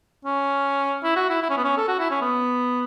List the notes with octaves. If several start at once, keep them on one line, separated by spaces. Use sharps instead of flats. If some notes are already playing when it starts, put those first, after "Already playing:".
C#4
E4
F#4
E4
E4
C#4
B3
C#4
A4
F#4
E4
C#4
B3